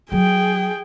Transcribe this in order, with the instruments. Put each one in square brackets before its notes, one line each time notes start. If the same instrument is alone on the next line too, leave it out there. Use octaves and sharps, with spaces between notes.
[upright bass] F#3 [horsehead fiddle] G#4 G5